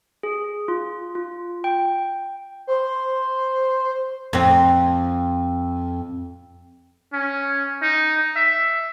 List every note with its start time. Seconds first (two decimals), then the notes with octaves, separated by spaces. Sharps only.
0.23 G#4
0.68 F4
1.15 F4
1.64 G5
2.67 C5
4.33 F2 C4
7.13 C#4
7.82 D#4
8.36 E5